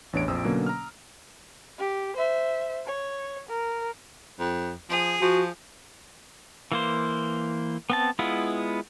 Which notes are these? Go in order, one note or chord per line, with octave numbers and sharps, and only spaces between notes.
A1 E2 D4 C#5 D7
A#1 F2 C4 D#6 E6
B2 D3 F#3 A#3 C#4
A#5 F6
G4
C5 E5
C#5
A#4
F2
F3 G#4
F3 F#4
E3 A#3 C5
B3 C4 A5
G#3 B3 E4 F4